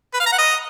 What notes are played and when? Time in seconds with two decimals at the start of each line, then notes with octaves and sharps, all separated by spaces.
0.14 B4
0.20 F5
0.26 A#5
0.32 F#5
0.38 D#5